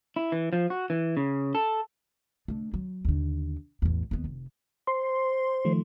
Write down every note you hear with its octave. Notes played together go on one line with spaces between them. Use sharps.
E4
E3
F3
F#4
E3
C#3
A4
D3 A3
F#3
D#2 D3
A1 E2
D#2 B3
F1
C5 C6
D#3 F3 A3